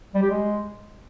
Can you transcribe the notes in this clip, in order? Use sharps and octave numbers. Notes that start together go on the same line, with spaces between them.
G3
G4
G#3